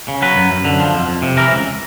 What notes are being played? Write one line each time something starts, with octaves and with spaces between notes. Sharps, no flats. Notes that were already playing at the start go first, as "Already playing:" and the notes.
C#3
F#3 B4
F#2
F#2
D3
F3
F2
F2
C3
E3 A#4
C#2